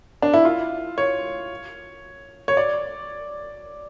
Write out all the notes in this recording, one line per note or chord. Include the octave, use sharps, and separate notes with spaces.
D4
E4
F4
C#5
C#5
D5